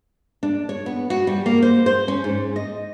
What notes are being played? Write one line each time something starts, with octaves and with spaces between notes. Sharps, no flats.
D4
C#5
B3
F#4
G3
A#3
C5
C5
C#4
G#2
D#5